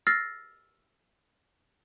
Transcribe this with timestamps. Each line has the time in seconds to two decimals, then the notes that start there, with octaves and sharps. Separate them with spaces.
0.07 E6 F6 A6 A#6 C7